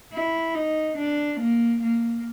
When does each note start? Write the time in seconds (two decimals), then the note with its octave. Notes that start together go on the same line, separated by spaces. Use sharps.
0.14 E4
0.55 D#4
0.98 D4
1.40 A#3
1.83 A#3